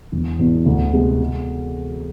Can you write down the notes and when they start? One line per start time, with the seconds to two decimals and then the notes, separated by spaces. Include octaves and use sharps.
0.12 E1
0.39 E2 B2 B3
0.66 D2
0.93 C3 G#3 B3
1.20 B2